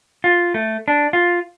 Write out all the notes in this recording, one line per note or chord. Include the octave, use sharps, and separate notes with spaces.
F4
A3
D4
F4